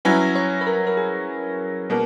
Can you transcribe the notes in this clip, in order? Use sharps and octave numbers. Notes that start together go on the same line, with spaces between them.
F#3 C#4 E4 B4
C#5
B4
A#4
A#4
G#4
B2 A#3